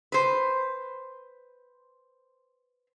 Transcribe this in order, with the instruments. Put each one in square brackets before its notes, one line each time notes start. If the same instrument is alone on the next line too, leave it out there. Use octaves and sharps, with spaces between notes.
[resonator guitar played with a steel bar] B4 C5